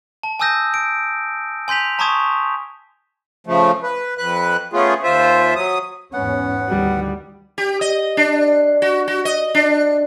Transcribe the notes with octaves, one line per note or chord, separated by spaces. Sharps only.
A5
G#5 A5 D#6 E6 G6 A#6
D7
G#5 C6 G6 B6 F7
A5 A#5 C6 C#6 D#6 G#6
C#3 F3 A3
B4
F2 B4 F#6
A3 B3 C#4 F4 G#4
D#2 F4 C5 E5
F#3 D#6
E2 G#2 B3 C#4 F#5
D2 D#3 E3 G3
G4
D#5
D4
F#4
F#4
D#5
D4